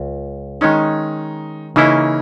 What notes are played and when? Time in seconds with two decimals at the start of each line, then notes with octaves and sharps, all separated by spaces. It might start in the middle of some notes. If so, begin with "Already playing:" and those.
Already playing: C#2
0.61 D#3 G#3 C#4 D#4
1.76 C#3 E3 A#3 C#4 D#4 E4